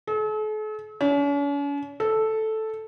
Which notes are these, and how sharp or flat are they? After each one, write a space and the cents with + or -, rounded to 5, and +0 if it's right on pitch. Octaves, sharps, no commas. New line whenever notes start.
A4 -45
C#4 +45
A4 -5